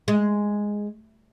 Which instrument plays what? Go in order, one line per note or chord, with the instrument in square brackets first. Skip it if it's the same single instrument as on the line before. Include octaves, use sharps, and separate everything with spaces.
[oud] G#3